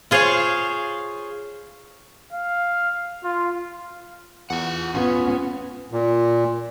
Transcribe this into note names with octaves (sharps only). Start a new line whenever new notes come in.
F4 G#4 C5 C#5 F5
F5
F4
E2 F4 F#5
B3 C#4 F4
A#2